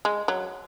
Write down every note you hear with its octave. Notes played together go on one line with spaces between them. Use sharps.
G#3
F#3